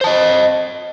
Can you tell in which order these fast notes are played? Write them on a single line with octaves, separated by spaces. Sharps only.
C5 A5 D#5